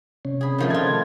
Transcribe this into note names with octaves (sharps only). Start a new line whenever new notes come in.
C3 C#4
G#4 B5
D#3 F3 A3
C4 F4 A5 G#6